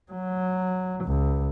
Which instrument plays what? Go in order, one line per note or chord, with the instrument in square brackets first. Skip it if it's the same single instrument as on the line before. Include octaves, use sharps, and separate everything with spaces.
[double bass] F#3
C#2